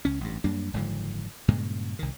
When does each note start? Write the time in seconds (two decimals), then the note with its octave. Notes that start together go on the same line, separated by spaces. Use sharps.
0.05 C#2 C#4
0.21 A1 G2
0.44 F#2 G3 A#3 D4
0.74 F#1 G#2 D3 F3
1.48 G2 A#2 C#3 G#3
1.99 C2 D#3